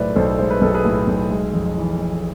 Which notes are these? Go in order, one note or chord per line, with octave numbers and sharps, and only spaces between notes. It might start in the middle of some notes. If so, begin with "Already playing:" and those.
Already playing: B1 A2 G#3 B4 C5 D5 E5
B1 A4 C5
G#3 C5
B4
B1 A4
G#4 B4
A2
B1
G#3
F2
E3
F2